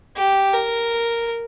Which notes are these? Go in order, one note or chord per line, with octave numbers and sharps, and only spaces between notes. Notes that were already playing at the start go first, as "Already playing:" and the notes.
G4
A#4